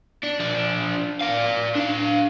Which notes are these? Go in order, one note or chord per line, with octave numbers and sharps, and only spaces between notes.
D4
F3 D4
D5 F5
D4 F5